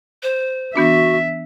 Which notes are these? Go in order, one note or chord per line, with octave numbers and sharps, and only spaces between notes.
C5
E3 B3 D4 F#4 E5